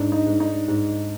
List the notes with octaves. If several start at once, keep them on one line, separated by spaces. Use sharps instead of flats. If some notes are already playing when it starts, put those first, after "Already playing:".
Already playing: G#2 D4
D#4
G#2
D#4
G#2